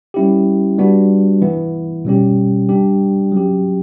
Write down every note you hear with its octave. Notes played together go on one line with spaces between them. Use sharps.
G3 C#4 E4 G4
G3 B3 D4 F#4
E3 B3 E4
B2 G3 C#4 G4
G3 D4 G4
F#3 C#4 G4